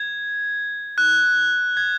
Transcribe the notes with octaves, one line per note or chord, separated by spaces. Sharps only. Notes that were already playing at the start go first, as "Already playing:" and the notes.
Already playing: G#6
F#6
G#6